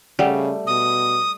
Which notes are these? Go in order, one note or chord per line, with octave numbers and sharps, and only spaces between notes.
C#3 G3 A3 D5 F#5 G5
B2 D#6